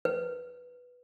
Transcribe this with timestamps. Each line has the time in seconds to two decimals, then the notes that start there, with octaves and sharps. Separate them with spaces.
0.05 B4